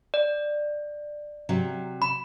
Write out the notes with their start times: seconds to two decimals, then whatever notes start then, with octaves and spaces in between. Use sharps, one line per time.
0.14 D5
1.49 C3 F#3
2.02 B5